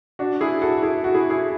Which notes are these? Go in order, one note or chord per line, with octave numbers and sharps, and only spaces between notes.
D4 F#4
E4 G#4
F#4 A4
E4 G#4
F#4
E4 G#4
E4 G#4